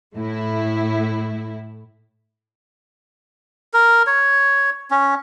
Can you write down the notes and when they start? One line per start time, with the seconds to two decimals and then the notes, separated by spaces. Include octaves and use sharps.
0.15 A2 A3 E4
3.73 A#4
4.07 C#5
4.91 C#4